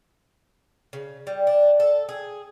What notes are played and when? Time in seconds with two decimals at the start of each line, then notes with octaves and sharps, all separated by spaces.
0.93 C#3
1.27 G3
1.47 D4
1.80 A4
2.09 G#4